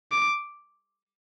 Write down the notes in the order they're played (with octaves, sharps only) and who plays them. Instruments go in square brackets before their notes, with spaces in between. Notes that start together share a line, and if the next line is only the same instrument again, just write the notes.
[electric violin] D6